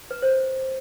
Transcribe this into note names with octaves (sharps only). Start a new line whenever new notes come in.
B4
C5